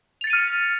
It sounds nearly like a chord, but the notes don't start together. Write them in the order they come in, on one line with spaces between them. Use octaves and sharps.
F7 A6 C#7 D#7 F6